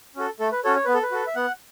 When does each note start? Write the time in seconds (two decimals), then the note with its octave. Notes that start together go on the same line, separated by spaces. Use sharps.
0.16 C#4 F#4 A4
0.40 A3 A4
0.52 B4
0.64 C#4 F#4 A4 C#5
0.76 C#5
0.85 B3 B4
0.94 A4
1.03 B4
1.11 F#4 A4
1.27 E5
1.35 B3 F#5